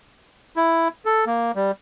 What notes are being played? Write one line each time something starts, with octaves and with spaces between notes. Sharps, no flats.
E4
A4
A#3
G3